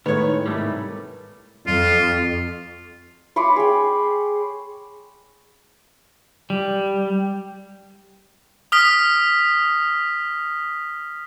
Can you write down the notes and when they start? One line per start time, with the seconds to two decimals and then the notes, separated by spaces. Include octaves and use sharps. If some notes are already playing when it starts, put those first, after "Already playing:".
0.06 A2 D#3 G#3 B3 C#5 D#5
0.46 G#2 C3 D#3 G3 A3
1.67 F2 F4
3.36 C#5 B5 C6 D6
3.56 G#4 G5
6.50 G3
8.72 D#6 F6 B6